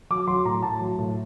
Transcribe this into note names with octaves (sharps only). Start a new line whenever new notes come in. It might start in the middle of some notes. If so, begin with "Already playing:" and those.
F#3 D6
F#3 C6
A2 A#5
A2 A5
F#3
A2